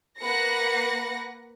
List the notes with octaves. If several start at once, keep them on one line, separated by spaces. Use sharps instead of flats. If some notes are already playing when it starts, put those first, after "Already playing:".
A#3 B4 F#5 A#6 C#7